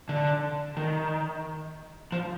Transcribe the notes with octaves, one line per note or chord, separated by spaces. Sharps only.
D3
D#3
F3